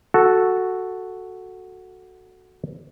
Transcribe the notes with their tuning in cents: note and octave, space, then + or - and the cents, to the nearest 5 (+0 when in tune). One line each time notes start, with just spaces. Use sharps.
F#4 +0 A4 +0